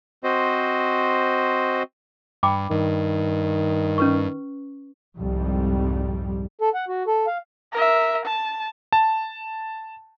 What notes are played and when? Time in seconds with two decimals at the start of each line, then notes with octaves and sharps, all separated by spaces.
0.24 C4 F#4 C5 D#5
2.43 G2 G5 B5 D6
2.70 G2 D#3
3.98 C#4 B4 C#6
5.18 C2 F2 G#2 G3
6.61 A4
6.74 F#5
6.88 F#4
7.07 A4
7.27 F5
7.73 A#4 E5
8.25 A5
8.93 A5